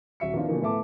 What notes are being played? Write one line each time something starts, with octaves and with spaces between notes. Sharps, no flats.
D#1 F#4 E5 C#7
D#3 F3 B3 D4 F4
B2 D3 E3 F3 A#3
A2 A3 B3 E5 A5 D6